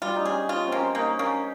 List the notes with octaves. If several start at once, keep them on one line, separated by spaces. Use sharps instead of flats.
G3 F4
D#4
C#4 G#4
F4
A#3 C4 C#4
A#3 D#4
A#3 C#4